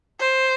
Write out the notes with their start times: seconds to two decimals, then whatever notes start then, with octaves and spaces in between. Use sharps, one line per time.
0.20 C5